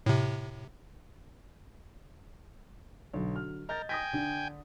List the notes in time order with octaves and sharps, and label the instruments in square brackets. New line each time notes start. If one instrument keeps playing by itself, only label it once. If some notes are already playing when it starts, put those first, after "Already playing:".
[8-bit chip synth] A2 C3
[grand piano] B1 [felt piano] D3 F#3
[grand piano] F6
[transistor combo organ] A#4 [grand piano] D#5 G6 A6
[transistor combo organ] G5 G#5 [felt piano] D#6 A#6 B6
[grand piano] D3 [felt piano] D4